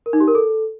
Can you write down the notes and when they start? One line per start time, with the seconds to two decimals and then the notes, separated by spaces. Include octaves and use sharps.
0.06 A#4
0.13 D#4
0.20 G4
0.28 A#4
0.35 A4